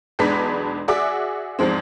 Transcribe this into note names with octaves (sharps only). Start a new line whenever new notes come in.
B1 E2 G#3 D4 B4 B6
F#4 G#4 D5 E5 F#5 D6
E2 G#2 F3 G#3 C4